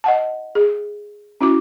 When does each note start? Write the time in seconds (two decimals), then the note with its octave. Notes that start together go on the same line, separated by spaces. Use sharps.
0.04 D#5 F#5 A5
0.55 G#4
1.41 C#4 E4 F#4 D6